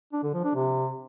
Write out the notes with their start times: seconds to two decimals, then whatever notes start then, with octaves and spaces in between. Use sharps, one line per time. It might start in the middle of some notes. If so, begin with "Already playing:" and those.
0.13 D4
0.23 D3
0.34 F3
0.44 D4
0.55 C3